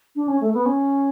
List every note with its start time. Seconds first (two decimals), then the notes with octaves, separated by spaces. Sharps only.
0.16 D4
0.28 C#4
0.41 A3
0.54 B3
0.66 C#4